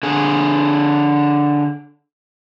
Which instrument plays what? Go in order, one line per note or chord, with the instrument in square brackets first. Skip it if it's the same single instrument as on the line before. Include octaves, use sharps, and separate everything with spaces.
[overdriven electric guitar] D3 G#4